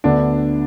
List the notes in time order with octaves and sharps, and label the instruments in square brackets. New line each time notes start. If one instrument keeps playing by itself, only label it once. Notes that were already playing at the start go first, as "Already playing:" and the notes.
[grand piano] D2 D3 B3 [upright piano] D4